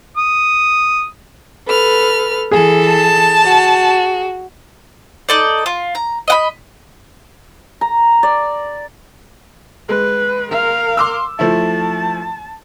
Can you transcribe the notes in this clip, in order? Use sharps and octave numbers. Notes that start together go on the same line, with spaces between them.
D#6
A4 B4 F6
E3 G#4 A4
A5
F#4
D#4 A4 D5
F4
A#5
D#5 F#5 B5
A#5
D5
G#3 B4
A#4 F5
C6 D6 E6
F3 A3 E4 A5